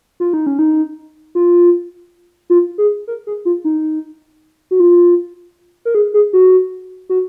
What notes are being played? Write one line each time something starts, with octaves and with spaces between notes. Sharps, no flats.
F4
D#4
C#4
D#4
F4
F4
G#4
A#4
G#4
F4
D#4
F#4
F4
A#4
G#4
G#4
F#4
F#4